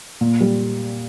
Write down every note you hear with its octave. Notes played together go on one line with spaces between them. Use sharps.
A#2
G3